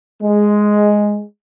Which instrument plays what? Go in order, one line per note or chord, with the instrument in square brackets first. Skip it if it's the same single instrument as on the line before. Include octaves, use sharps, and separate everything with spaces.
[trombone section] G#3